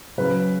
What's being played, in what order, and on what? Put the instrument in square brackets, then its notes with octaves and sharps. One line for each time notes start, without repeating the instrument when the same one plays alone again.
[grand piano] C#3 F#3 C#4 B4